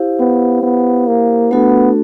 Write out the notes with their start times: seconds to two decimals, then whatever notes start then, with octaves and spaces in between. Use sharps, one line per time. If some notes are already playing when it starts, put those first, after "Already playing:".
Already playing: E4 G4 C5 F5
0.20 B3
0.63 B3
1.07 A#3
1.51 A3 B3 D4 F#4 A4